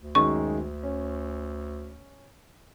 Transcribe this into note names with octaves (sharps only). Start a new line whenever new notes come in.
D2
F#2 D#3 G#3 C#6
C#4